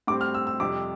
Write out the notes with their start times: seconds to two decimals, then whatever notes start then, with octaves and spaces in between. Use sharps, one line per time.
0.07 A2 G3 C4 D6
0.21 F6
0.34 E6
0.47 E6
0.60 F2 C3 G3 D6